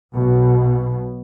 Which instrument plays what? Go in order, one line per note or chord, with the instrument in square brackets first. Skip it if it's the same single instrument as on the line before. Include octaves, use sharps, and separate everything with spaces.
[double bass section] B1 B2